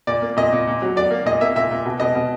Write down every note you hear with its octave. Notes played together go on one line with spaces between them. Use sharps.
A#2 D5
A#3
A#2 D#5
A#2
A#2
F#3
F#3 D5
A#3
A#2 D#5
A#3 E5
A#2 E5
A#2
B2
B2 D#5
B2